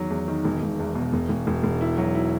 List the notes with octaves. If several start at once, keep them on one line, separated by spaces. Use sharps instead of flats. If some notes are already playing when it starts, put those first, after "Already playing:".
Already playing: E2 D#3 F#3
E2
D#3
E1
E1
E2
B2
E1
E1
E1
E1
E4
F#3
E4